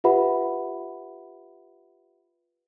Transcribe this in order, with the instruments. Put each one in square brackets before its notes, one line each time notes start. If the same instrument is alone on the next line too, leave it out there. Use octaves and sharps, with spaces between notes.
[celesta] F4 G4 B4 E5 F#5 B5